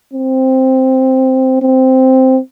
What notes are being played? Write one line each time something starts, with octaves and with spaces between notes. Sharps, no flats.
C4
C4